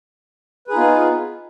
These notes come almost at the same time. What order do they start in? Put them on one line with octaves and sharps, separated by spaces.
B4 G#4 D#4 F4 B3